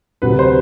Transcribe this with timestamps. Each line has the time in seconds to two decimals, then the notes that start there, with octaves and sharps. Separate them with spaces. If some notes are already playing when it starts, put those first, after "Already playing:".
0.22 D2 C3 F#3 B4
0.39 C5